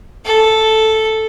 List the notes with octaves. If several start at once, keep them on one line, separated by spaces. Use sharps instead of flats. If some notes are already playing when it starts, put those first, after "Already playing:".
A4